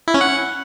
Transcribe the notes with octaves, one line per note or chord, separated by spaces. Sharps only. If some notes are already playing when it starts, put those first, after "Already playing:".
E4
C#4
F#5